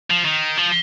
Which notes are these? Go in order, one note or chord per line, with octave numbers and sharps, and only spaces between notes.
F3
D#3
F3